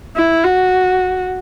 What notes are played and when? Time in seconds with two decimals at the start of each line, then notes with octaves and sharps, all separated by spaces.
0.16 E4
0.44 F#4